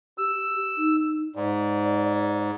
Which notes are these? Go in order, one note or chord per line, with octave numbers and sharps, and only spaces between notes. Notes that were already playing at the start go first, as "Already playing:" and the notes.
G4 E6
D#4
G#2 D5